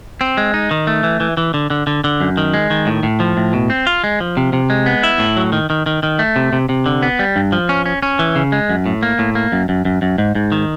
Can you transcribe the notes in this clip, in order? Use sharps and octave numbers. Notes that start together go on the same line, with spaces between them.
C4
G#3
D#4
D#3
A3
E3
E3
E3
D3
D3
D3
D3
F#2
D#3
G#3
D#3
A2
A2
F3
A2
B2
C4
F4
G#3
F3
C3
C3
G#3
B3
E4
A2
F#3
D#3
D#3
D#3
D#3
A3
C3
C3
C3
D3
B3
G3
G2
F3
C#4
C#4
C#4
E3
C#3
G#3
F#2
A2
A#3
A2
A#3
F#2
F#2
F#2
F#2
G#2
G#2
D#3